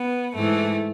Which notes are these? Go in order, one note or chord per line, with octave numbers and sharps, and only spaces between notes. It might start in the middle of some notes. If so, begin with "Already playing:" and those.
Already playing: B3
G#2 E3 A3